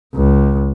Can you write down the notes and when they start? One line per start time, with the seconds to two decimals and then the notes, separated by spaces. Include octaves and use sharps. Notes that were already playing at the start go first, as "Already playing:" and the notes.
0.14 C#2